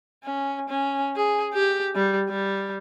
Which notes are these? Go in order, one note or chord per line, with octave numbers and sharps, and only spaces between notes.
C#4
C#4
G#4
G4
G3
G3